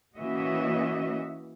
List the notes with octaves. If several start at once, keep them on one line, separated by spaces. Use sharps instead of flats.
E3 A#3 C#4 F#4 D#5 E5